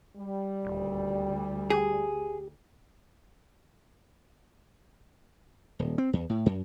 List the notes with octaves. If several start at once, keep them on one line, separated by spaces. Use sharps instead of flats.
G3
D#1 D2
G4 G#4
D#1
C4
E2
A2
F#2